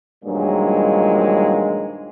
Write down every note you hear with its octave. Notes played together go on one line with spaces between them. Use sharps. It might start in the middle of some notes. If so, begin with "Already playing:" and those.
G2 A#2 D#3 F3 F#3 G#3